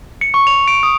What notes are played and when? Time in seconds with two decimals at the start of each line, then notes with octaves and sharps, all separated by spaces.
0.21 C#7
0.34 C#6
0.47 F7
0.68 D7
0.83 D#6